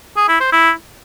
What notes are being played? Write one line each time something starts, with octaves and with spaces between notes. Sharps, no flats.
G#4
E4
C5
E4